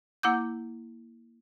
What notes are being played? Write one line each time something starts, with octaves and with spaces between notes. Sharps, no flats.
A#3 E4 F#5 D6 G6